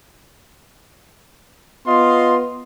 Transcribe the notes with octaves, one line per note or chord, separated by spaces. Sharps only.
B3 F4 D#5 C6